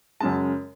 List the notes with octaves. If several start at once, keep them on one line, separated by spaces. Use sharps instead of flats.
F#2 C#3 G#3 A5